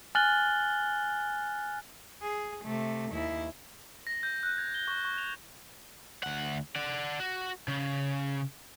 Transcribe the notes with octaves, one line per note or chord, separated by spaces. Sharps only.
G#5 F6 F#6 A6 F#7 G7
G#4
C3 A3
D#2 E4
A#6
G6
F#6
G#6
G7
C#6
C#6
F7
D2 F#5
D5 F#5
F#4
C#3